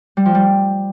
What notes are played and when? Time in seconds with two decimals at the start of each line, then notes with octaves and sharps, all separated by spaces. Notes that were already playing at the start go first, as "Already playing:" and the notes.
0.17 G3
0.26 F3
0.35 G3